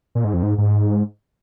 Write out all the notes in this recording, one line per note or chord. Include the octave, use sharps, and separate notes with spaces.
A#2
G#2
F2
G#2
G#2